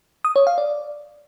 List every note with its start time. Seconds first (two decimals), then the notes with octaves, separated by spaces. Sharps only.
0.25 D#6
0.36 C#5
0.47 F5
0.58 D5